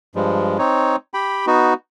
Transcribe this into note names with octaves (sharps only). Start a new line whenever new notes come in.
G2 F3 G3 G#3
C4 D#4 C#5
G4 G5 B5
B3 D#4 F#4